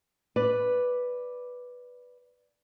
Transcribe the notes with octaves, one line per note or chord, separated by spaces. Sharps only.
B4 D5